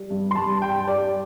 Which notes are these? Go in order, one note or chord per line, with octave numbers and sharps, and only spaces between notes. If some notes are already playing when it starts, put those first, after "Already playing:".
Already playing: G3
G2
C6
G2 A5
G3 G5
G3 D5